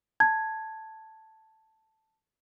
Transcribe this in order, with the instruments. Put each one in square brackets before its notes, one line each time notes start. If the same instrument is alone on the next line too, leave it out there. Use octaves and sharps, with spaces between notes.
[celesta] A5 G#6